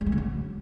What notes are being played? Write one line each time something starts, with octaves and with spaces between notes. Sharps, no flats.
G3
A3
D3
F#3